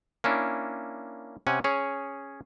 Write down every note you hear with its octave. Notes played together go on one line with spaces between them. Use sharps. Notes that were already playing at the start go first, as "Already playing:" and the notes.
A#3 C#4 D4 E4
C3 C#4 F#5 G#5
C#4 G#4 C#5